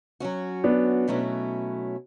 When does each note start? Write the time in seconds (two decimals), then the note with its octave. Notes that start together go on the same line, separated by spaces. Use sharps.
0.20 F#3 C#4 F#4
0.64 B3 D4
1.08 B2 F#3 A3 C#4 E4